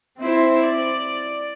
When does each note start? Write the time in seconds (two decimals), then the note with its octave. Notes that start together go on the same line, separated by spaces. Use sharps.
0.20 C4 E4 C5
0.64 D5